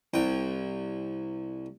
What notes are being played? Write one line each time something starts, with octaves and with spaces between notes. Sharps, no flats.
C2 G5